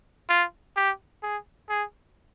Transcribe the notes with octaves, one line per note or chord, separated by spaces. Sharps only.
F4
G4
G#4
G#4